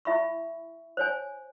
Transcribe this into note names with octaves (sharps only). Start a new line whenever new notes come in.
E4 E5 B5 C#6
C5 C#5 G#5